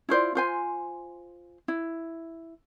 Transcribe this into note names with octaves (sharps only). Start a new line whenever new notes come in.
E4 F4 C5 D5
F4 C5 G#5
E4